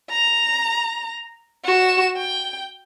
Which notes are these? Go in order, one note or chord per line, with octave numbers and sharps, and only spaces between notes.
A#5
F#4 E7
G5